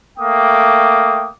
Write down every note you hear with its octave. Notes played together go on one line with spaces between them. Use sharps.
A3 A#3 G5 D6 D#6